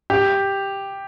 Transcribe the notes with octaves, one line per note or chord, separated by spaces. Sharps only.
G4